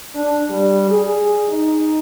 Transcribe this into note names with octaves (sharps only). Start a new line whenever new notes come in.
D4
G3
G#4
D#4